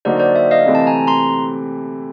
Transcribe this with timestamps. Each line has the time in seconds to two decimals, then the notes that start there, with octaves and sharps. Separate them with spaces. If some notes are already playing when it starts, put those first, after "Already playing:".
0.05 D3 F#3 A#3 D#4 F#4 C5 D5
0.20 C5 D5
0.36 D5 E5
0.51 D#5 F5
0.66 C3 E3 A3 C4
0.75 A5
0.87 G#5 A#5
1.07 A#5 C6